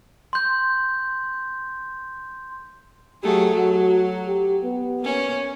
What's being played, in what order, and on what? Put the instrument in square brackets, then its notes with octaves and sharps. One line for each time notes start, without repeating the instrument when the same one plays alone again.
[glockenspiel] C6 G6
[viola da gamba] F#3 A3 G#4 [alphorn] G4
[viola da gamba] F#3 [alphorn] F#4
[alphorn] G4
B3
[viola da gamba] A#3 C#4